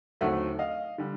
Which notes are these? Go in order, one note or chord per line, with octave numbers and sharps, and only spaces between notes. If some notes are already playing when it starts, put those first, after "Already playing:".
D#2 D3 F#3 A3 C4 E5 F#5
D#5 F5
D3 G3